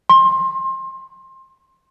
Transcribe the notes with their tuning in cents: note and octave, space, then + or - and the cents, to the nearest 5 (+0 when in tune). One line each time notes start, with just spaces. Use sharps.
C6 +25